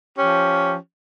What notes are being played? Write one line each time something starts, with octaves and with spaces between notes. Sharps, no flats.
F3 C#4 G4